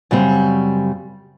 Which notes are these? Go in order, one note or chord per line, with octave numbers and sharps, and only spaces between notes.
F#2 C#3 G3 C4